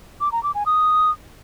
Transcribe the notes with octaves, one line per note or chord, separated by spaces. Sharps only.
D6
A#5
D6
G#5
D#6